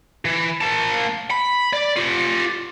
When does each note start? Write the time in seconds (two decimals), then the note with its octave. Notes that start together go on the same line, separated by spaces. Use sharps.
0.25 E3
0.61 A#3 A5
1.31 B5
1.73 D5
1.97 F4 G4